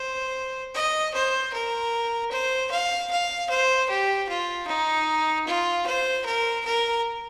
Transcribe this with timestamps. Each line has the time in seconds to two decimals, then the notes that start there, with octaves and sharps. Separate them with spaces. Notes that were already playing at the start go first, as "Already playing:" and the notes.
Already playing: C5
0.75 D#5
1.14 C5
1.53 A#4
2.31 C5
2.71 F5
3.11 F5
3.50 C5
3.90 G4
4.29 F4
4.67 D#4
5.47 F4
5.87 C5
6.25 A#4
6.65 A#4